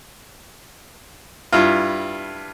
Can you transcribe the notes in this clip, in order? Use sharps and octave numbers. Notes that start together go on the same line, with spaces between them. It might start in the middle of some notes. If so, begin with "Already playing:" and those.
G2 E4 F4